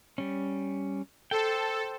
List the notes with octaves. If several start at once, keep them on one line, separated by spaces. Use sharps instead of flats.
G3 C#4
A4 C5 G5